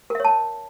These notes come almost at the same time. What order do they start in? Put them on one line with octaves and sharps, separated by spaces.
A#4 E5 C#5 A5